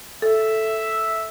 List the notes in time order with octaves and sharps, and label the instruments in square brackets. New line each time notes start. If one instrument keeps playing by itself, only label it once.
[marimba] A4 [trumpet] E5